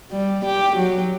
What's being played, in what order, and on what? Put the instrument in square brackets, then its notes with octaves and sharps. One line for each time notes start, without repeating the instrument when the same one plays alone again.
[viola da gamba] G3
G4
F#3